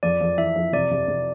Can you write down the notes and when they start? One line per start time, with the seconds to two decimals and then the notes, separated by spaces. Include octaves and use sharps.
0.03 F2 D5
0.21 F2
0.37 E3 E5
0.56 F2
0.73 C3 D5
0.91 C3
1.08 C3